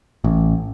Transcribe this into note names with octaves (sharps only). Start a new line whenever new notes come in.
A1